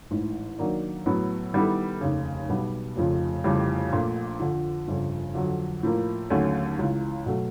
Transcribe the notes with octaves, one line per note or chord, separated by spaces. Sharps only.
A1 G#2 E3
D#3 F#3 A#3 D4
A2 F#3 B3
D#3 G3 B3 E4 A4
F1 D#2 C#3
B1 B2 G3 B3
F1 F2 C#3 F3
F1 F2 C#3 E3 G3
A#1 A#2 F3 A3
F2 D3 F3
G1 F2 C#3
F2 D3 F#3
A2 F3 A#3
D#2 D3 F#3 A3 C#4
C#2 C#3 E3
B2 F#3 A3